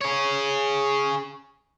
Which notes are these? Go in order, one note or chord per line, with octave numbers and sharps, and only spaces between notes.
G#4 C#5